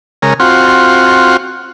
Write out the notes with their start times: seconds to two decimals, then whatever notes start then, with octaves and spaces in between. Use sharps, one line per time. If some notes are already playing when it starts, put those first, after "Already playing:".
0.22 C#3 G#3 A#4
0.40 C4 F4 F#4